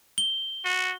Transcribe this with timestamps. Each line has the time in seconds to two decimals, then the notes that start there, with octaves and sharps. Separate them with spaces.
0.18 G7
0.64 F#4